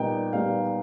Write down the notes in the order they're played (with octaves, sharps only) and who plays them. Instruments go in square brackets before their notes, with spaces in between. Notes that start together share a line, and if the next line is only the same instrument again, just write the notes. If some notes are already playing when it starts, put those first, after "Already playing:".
Already playing: [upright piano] A#2 G3 B3 D#4 G5
A#2 G3 B3 D#4 F5